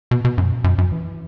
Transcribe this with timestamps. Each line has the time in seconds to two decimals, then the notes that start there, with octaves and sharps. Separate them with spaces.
0.11 B2
0.25 B2
0.38 F#2
0.64 F#2
0.78 F#2
0.92 E3